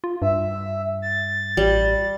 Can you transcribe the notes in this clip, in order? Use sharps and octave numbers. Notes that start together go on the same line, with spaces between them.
F4
G2 E5
A6
A1 G3